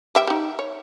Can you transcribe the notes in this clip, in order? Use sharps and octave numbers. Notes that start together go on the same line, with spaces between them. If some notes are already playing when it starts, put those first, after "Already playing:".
G3 E5 G5
D#4 G4
C#5